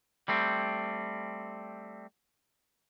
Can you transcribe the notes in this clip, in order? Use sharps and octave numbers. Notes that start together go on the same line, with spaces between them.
G3 A3 C4